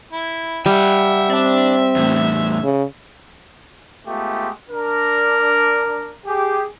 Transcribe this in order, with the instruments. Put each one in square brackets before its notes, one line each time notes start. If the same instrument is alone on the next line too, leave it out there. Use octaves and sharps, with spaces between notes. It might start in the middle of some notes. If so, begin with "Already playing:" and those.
[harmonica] E4
[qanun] G3 [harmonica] E5 [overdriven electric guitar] F#5 G5
[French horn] C4 [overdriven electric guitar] D5 A5
[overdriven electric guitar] E2 A2
[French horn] C#3
[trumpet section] G#3 A3 B3 F4 G4
D4 A#4
G4 G#4